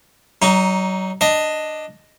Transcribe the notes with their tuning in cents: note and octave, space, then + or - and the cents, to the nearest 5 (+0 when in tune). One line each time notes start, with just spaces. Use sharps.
F#3 +35 D#4 +0
D4 +10 D#5 +0